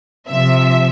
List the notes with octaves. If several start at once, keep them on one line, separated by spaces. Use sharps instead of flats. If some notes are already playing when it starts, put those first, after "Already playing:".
C3 F3 E5